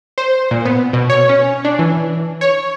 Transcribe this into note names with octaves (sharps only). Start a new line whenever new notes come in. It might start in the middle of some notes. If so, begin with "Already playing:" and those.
C5
A#2
B3
B2
C#5
C#4
D4
E3
C#5